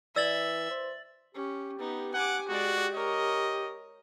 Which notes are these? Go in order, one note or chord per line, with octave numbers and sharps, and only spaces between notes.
E3 D5 E5 E6 A6 F#7
C5
C#4 G4
B3 D#4
F#5 G#5 D6
G#3 F#4 D5
A#4 C#5 D#5